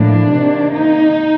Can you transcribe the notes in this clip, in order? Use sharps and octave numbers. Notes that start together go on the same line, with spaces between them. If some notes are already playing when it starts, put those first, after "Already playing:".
Already playing: A2 F3 A#3 D4
C3 D#3 A#3
D#4